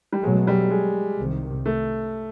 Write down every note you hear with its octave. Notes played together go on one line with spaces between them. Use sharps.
G3
B2 F#3 G#3 A3
G3
G#3
C2 C3 D#3
A3